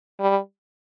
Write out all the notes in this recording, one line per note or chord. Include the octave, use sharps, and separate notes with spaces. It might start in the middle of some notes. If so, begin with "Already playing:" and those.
G3